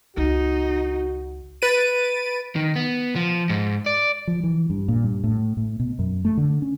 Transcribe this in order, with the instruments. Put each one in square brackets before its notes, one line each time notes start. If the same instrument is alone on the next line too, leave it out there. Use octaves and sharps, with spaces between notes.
[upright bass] C#2 D#3 [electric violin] D#4 [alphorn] F#4
[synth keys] B4 A6 D7 D#7
[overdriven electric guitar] D#3
B3
F3
G#2
D5
[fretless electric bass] F3
E3
G2
A#2
G2
A2
A2
B2
F#2
A3
D3
C#4